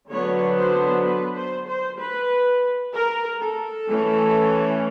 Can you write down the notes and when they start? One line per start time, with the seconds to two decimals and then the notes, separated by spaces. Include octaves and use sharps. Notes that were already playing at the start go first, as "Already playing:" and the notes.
0.10 D3 F#3 B3 D4 C#5
0.57 C5
1.05 B4
1.36 C5
1.67 C5
2.00 B4
2.94 A#4
3.41 A4
3.87 E3 A3 C#4